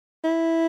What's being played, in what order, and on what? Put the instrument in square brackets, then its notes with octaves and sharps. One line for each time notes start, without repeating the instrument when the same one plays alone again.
[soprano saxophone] E4